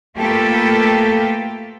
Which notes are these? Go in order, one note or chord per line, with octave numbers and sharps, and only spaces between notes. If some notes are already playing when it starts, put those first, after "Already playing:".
A3 A#3 F4 G4 A4 B4